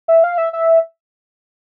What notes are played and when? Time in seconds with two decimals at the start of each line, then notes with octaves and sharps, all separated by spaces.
0.08 E5
0.24 F5
0.38 E5
0.53 E5